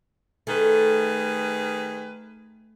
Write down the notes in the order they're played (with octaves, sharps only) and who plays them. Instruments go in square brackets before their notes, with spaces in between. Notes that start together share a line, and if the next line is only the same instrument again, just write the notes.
[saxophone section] D#3 G#4 B4 [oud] A3